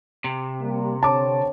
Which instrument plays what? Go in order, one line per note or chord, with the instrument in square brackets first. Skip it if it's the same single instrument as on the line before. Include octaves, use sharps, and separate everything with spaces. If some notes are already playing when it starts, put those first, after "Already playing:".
[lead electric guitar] C3
[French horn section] G3 A#3
[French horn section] D3 C4 C#5 [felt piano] A5 D6